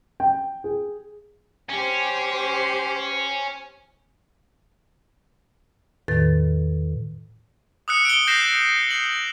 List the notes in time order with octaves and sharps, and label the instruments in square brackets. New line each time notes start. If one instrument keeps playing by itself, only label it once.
[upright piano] G5
G#4
[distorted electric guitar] C#4 [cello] G4 C5
[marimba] E2 A2 D#3 B4 A6
[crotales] D#6 E6 F#6 C#7
D7 G7
G6 A#6 C7 E7
C7 F#7